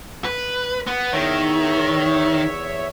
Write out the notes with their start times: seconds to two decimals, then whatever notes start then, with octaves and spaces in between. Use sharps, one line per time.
0.25 B4
0.87 B3
1.13 E2 D#3 C#5 E5